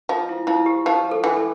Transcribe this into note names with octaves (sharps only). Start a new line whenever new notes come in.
F3 F4
E4
F3 E4
G4
F3 G4
A4
E3
A4